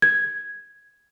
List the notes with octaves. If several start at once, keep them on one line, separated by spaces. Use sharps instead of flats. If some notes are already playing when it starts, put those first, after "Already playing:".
G#6